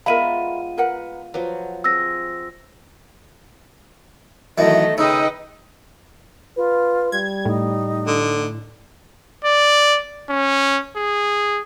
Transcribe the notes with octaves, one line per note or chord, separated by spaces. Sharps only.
G#3 B3 F4 A#4 E5 F5 B5 D#7
A#4 B4 F#5
F3 F#3 B4
C4 G#4 E6 A#6
F#2 D#3 E3 A3 A4 D#5
C#3 D#4 B4 D#5 G5 E6
F4 B4
G3 G#6
A2 D#4
D3
D5
C#4
G#4